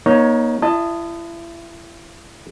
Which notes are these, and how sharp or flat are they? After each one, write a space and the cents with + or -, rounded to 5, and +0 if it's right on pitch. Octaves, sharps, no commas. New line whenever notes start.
A#3 +40 D#4 +0 C#5 +0
E4 +35 D#5 -15 A5 +10